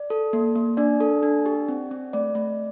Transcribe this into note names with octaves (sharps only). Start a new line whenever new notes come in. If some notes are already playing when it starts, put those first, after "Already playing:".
Already playing: D5
A4
A#3
A#3
D4 D5
A4
D4
G4
C4
C4
A3 D5
A3